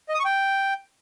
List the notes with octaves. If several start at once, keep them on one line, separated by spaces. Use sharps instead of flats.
D#5
D#6
C#6
G5